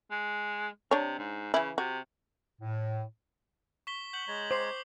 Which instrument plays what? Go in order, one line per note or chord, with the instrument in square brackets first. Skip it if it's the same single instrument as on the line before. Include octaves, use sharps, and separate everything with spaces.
[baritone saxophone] G#3
[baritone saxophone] C3 [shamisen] D4 C#5
[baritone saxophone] G#2
[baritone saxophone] C#3 [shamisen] E3 E4
[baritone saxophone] C3 [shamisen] F#4
[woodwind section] A2
[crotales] C#6 B6 G7
[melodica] F#5 [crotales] G6 F#7
[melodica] G#3 C#5 A#5
[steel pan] C5 [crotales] D6 C7